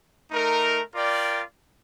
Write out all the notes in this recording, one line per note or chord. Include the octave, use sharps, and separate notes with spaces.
A3 D#4 A#4
F4 A#4 D5 G5